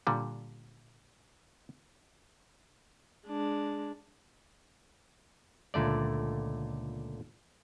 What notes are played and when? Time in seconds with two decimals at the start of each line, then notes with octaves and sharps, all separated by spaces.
0.07 A#2 D3 G3
3.27 G#3 D4
5.74 C#2 A#2 D3 A3 D5